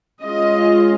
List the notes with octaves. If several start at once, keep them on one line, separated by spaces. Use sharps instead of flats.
G#3 C#4 F4 D#5